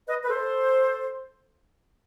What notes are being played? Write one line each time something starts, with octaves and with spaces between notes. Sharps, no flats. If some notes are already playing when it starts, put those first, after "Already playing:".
B4 D#5
B4
A4 C5